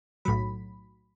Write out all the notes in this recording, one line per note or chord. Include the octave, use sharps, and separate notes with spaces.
B1 A2 F#3 B5